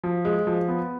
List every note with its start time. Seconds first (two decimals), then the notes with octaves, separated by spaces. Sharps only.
0.04 F3
0.25 G#3
0.47 F3
0.68 B3